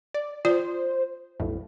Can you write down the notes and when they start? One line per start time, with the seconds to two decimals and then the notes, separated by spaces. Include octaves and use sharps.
0.14 D5
0.45 F4 C5 D5
1.40 B1 F2 A2